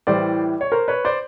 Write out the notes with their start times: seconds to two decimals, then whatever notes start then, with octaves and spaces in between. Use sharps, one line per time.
0.07 A2 E3 G3 C5 D5
0.61 C#5
0.72 A#4 C5
0.88 B4 C#5
1.05 C5 D5